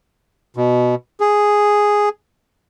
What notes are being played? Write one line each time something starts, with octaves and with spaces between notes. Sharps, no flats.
B2
G#4